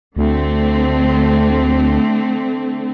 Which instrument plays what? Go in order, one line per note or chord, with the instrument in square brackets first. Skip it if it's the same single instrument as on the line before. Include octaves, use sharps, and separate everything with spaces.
[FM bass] D2 [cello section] D3 A3 C4